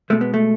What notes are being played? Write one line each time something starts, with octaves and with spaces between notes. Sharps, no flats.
B2 G#3 A3
B3
A3